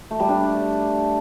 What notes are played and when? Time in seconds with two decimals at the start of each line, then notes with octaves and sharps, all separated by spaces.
0.11 A3
0.20 G3
0.29 D4